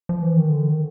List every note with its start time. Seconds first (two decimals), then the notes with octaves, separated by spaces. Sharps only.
0.09 F3
0.23 E3
0.37 D#3
0.50 D3
0.69 D#3